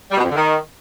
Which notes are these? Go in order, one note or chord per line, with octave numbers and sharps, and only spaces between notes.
G3
B2
F2
D3
D#3